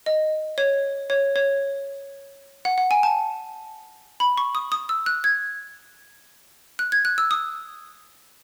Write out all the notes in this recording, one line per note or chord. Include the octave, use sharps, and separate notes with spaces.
D#5
C#5
C#5
C#5
F#5
F#5
G#5
A5
B5
C#6
D#6
D#6
E6
F#6
G#6
F#6
G#6
F#6
E6
D#6